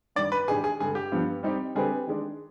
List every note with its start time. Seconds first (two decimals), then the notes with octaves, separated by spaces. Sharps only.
0.15 G2 D#3 G3 D5
0.32 B4
0.48 G#2 D#3 G#3 D4 G4 G#4
0.64 G#4
0.80 G2 D3 G#3 G#4
0.95 G4
1.12 G2 F3 B3
1.43 G3 C4 D#4 G4
1.75 D3 G3 C4 G4 G#4 B4
2.07 D#3 G#3 D4